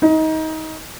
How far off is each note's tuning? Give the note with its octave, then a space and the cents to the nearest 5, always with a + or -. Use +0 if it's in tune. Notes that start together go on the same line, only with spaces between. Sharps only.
D#4 +25